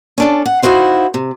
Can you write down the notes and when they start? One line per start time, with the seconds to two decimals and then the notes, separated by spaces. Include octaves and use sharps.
0.18 C#4 D4 A4
0.46 F#5
0.62 D#4 E4 F#4 C5 F5
1.14 C3